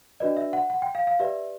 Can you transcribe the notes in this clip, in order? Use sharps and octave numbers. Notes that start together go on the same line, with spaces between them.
D4 F#4 B4 D5 D#5
E5
F#5
F#5
G5
F5
F5
G4 B4 D5 E5